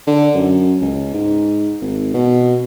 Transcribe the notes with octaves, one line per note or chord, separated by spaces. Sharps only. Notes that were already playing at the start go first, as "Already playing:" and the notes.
D3
F#2
C#2
G#2
G#1
B2